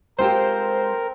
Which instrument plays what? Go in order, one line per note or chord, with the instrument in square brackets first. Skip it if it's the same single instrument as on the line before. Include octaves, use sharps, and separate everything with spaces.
[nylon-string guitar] G#3 F4 G4 [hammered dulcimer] C4 A4 [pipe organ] A#4 [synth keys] C5